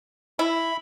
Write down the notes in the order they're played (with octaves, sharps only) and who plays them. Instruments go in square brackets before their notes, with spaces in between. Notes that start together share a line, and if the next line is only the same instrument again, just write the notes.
[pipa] E4 [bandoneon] B5